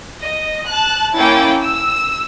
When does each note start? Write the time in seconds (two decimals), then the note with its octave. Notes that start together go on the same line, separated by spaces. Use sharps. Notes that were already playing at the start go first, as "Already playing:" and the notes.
0.20 D#5
0.66 A5 F#6
1.14 A#3 C#4 E4 G5 A6
1.61 E6